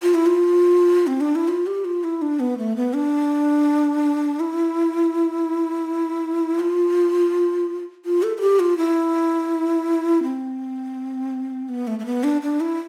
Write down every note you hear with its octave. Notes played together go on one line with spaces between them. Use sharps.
F4
E4
F4
C4
D4
E4
F4
G4
F4
E4
D4
B3
A3
B3
D4
E4
F4
F4
A4
A4
G4
F4
E4
C4
B3
A3
A3
B3
D4
D4
E4